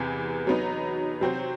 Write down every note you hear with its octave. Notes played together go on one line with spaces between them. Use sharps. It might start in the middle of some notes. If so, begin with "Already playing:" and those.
Already playing: E2 C3 E3 B3
F#3 B3 D#4
C3 F#3 C4 F#4 C5